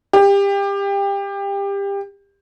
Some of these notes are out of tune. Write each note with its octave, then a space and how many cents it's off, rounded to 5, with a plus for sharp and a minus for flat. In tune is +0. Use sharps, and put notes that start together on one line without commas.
G4 +25